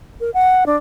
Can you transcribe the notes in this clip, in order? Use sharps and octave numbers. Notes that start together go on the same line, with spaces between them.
A#4
F#5
D4